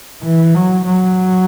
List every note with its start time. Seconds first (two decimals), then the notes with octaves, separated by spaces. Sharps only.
0.22 E3
0.55 F#3
0.86 F#3